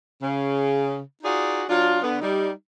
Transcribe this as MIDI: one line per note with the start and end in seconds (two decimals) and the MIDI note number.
0.21 0.99 49
1.22 1.63 63
1.22 1.63 65
1.22 1.63 66
1.22 1.63 68
1.22 1.63 74
1.69 2.00 54
1.69 2.00 62
1.69 2.00 65
2.02 2.17 50
2.02 2.17 59
2.20 2.50 55
2.20 2.50 63